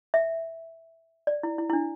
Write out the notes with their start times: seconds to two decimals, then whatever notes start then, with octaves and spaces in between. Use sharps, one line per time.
0.14 E5
1.27 D5
1.43 E4
1.58 E4
1.70 E4
1.73 D4